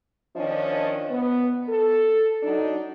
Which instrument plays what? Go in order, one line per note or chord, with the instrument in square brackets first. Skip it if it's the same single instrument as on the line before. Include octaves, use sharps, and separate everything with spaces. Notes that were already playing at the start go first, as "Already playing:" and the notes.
[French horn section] D#3 F3 C#4 D4 D#5
B3
A4
F#3 D4 D#4